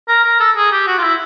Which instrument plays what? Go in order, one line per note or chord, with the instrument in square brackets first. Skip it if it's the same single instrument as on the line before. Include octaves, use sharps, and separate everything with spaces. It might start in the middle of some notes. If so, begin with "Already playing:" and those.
[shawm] A#4
A#4
A4
G#4
G4
F#4
F4
E4